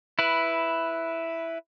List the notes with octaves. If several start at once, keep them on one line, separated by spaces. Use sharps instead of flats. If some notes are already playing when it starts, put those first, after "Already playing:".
E4 B4